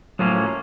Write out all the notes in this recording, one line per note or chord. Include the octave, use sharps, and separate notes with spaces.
A2 F3 F#3 A#3 C#4